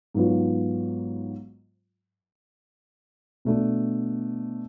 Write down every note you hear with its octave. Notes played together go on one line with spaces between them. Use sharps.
G#2 F#3 B3 F4
B2 A3 D4